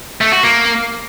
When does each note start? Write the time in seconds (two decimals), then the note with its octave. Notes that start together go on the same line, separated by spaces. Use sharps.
0.21 A3
0.32 F#4
0.43 A#3